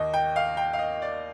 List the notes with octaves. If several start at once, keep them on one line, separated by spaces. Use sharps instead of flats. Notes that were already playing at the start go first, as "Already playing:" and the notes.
Already playing: D#2 D#3 D#5
G5
F5
G5
F5
D#5
D5